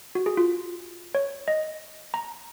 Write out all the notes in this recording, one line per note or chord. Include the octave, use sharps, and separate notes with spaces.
F#4
G#4
F4
C#5
D#5
A#5